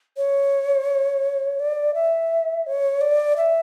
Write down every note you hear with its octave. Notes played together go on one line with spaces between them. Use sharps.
C#5
D5
E5
C#5
D5
E5